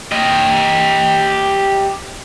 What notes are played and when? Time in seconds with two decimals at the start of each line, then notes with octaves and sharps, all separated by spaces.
0.12 G4 D#5